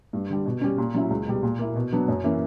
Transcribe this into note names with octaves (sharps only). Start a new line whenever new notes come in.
G2
D3 G3
B2
G3 C#4
A#2
F#3 C#4 E4
C#2
B2 G3
A#2
A#3 E4
B2
F#3 B3 D4
F#2
E3 A#3 C#4